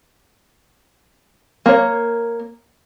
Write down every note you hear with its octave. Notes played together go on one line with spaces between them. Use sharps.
A#3 C#5